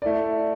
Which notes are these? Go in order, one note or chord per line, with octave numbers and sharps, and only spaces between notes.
A3 E4 D5